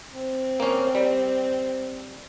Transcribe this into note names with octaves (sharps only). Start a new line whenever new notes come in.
C4
A#3 C#4
G3